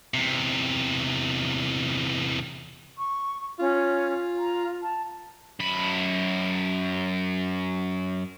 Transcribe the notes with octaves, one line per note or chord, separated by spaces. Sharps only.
E2 C3
C#6
C#4 F4
A#5
A5
F#2 B5